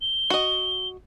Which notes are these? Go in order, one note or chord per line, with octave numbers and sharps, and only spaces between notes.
G7
F#4 D#5